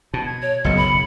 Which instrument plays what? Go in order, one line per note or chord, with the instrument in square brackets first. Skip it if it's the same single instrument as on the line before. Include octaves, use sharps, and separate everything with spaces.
[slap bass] B2 [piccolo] A5
[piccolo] G#6
[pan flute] C#5
[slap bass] F#1 B1 E2 [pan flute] D#5 [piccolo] C#7
[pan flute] B5